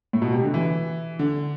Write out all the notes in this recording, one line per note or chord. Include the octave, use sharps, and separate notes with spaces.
A2
B2
C3
D3
E3
D3